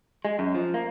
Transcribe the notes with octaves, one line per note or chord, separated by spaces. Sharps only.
G#3
F#2
F3
A#3